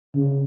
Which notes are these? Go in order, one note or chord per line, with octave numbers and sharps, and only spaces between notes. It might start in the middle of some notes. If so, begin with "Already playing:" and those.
C#3